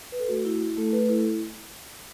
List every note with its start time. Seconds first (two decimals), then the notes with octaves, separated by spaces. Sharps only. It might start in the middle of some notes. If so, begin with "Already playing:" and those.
0.12 B4
0.20 A4
0.28 A3 F#4
0.45 E4
0.62 E4
0.77 A3 A4
0.93 A3 B4
1.09 E4 A4